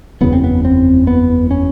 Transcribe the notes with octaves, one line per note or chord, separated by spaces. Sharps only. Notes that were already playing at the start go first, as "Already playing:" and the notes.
F#1 E2 C#3 B3
C4
B3
C4
B3
C#4